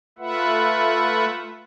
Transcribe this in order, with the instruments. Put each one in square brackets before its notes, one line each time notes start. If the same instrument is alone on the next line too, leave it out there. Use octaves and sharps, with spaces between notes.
[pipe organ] A3 F4 B4 E5 F#5